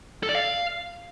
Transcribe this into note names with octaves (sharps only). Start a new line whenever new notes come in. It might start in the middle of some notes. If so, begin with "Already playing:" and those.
A4
D5
F5